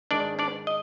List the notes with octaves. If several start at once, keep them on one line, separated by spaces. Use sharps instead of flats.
G#2 D#3 G#3 D4 D5
D4 D5
D#5